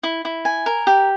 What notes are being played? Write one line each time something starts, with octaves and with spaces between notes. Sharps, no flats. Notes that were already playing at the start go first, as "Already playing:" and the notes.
E4
E4
G#5
A#4
G4